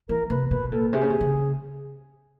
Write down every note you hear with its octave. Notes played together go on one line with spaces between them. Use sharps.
E3 A#4
C3 B4
B2 B4
A#2 A4
C3 G#4
C#3
C3
C#3